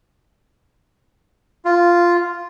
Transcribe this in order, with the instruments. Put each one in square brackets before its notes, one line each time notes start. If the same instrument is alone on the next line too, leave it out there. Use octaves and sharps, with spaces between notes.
[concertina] F4